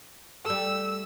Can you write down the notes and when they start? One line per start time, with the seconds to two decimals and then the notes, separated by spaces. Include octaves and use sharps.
0.46 G3 A3 A4 E6